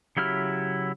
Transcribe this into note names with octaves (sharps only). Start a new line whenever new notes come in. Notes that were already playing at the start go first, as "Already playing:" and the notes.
C#3 F#3 E4 G4 F6